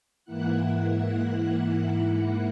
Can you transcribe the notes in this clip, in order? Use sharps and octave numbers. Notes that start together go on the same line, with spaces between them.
G#2 E3 A#3 E4 F#5 F#6